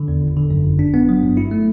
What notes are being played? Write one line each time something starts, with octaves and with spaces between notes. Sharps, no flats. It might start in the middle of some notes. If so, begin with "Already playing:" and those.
Already playing: D3
E2
G1
D3
F#2
G1
D4
B3
F#3
G2
E4
A3